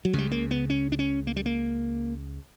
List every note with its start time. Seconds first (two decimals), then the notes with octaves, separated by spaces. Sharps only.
0.05 F#3
0.13 C#2 C#3 G3
0.31 A#3
0.51 B3
0.70 C#4
0.92 D4
0.99 C#4
1.27 A#3
1.36 G3
1.46 A#3